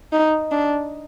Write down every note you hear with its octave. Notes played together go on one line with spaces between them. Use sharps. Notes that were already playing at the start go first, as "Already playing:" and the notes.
D#4
D4